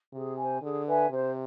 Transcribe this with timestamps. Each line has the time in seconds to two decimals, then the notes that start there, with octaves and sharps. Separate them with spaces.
0.13 C3 G#4
0.38 C5 G#5
0.62 D3 G#4
0.86 B4 E5 G#5
1.10 C3 C5